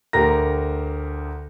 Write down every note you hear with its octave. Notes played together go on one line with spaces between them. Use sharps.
D2 G4 A#4 A#5 A#6